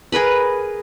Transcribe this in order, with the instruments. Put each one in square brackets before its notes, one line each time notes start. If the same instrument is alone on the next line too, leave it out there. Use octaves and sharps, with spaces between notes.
[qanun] G#4 A#4 B4 B5